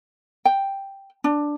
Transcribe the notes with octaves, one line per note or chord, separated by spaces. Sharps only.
G5
D4